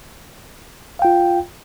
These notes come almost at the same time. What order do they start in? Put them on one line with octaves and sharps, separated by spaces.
F5 G5 F4